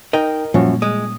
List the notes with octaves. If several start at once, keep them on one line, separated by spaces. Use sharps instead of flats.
D#4 A#4 D#5 G5
F#2 A#2 F3 G3 A#3 C#4 F#4
G#3 D#6